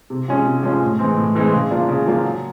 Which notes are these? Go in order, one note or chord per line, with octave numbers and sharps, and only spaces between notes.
C3
F3 G#3 C#4
C3
F3 G#3 C#4
A2
E3 G#3 C4
A2
E3 G#3 C4
C#3
F3 A#3 D4 F4
C#3
F3 A#3 D4 F4
F#3